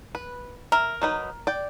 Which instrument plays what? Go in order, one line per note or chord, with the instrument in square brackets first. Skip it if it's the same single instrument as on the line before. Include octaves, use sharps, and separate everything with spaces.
[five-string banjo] B4
[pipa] A#4 [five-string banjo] E5
[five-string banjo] F#3 D#4 B4
D5 G5